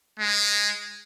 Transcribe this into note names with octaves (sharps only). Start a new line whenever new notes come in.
G#3